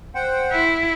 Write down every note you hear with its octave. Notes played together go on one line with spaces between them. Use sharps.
C5 F#5 G5
E4